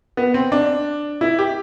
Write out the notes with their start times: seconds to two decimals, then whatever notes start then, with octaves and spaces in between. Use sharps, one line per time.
0.17 B3
0.34 C4
0.52 D4
1.21 E4
1.39 G4